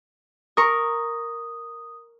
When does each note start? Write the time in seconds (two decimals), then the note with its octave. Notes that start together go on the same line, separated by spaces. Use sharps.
0.57 A#4 C#6 D#6